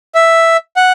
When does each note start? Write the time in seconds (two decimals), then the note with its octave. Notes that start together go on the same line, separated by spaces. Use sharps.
0.15 E5
0.76 F#5